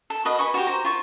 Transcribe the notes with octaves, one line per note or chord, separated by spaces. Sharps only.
A4
F#4 B4 D#5 F5
B4 G#5 C#6
F#4 G4
C5 A#5
F4 C#6